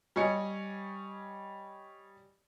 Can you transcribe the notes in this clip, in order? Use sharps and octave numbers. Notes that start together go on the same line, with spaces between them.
G3 C#5 D#5 G#5 C#7